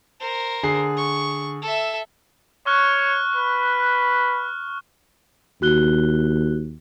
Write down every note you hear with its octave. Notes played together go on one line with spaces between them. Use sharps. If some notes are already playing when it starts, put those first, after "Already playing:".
A#4 C5
D3 G#4 C7
C#6
A4 E5
C#5 C#6 F6 F#6
B4
D#2 F#4 F#6 G7